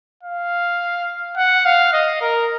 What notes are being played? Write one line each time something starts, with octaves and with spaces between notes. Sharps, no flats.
F5
F#5
F5
D#5
A#4